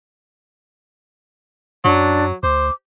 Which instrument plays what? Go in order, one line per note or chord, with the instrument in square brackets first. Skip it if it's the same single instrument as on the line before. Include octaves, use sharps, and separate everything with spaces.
[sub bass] F#2 [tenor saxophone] F#3 [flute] D4
[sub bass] D2 [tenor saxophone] C5 [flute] D6